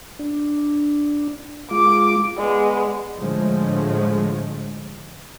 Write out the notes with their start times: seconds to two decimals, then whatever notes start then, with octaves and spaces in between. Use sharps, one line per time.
0.19 D4
1.71 G#3 F4 D6
2.38 G#3 B3 D5
3.18 A2 D3 F3 G#3 A3